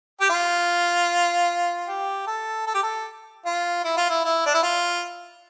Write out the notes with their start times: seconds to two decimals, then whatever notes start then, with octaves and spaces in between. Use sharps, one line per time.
0.21 G4
0.30 F4
1.87 G4
2.27 A4
2.67 A4
2.74 G4
2.82 A4
3.46 F4
3.84 E4
3.97 F4
4.09 E4
4.25 E4
4.46 D4
4.54 E4
4.63 F4